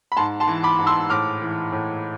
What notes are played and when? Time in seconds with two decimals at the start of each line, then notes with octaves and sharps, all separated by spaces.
0.12 B5
0.17 G#2 A5 C6
0.40 A5 C6
0.47 E3
0.63 B5 D6
0.79 G#2
0.87 C6 E6
1.10 A2 D6 F6
1.41 E3
1.72 A2